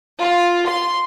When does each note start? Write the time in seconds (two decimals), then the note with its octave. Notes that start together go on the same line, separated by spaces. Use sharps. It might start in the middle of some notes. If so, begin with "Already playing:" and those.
0.20 F4
0.68 C6